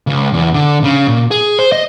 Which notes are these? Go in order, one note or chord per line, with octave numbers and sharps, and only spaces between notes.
C#2
E2
D3
C#3
A#2
G#4
C5
D#5